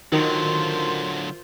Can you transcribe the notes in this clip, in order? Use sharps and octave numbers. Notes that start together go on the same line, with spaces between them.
D3 D#3 F#3 F4 F#4 A#4 C5